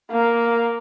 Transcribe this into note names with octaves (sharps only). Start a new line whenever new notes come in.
A#3